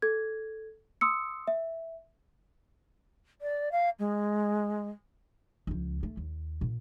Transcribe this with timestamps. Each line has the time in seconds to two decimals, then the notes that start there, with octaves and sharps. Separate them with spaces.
0.02 A4 G#6
1.01 C6 D#6 E6 C#7
1.48 E5
3.41 D5
3.72 F5
3.99 G#3
5.67 C#2 F3
6.03 A3
6.17 D#2
6.61 A#2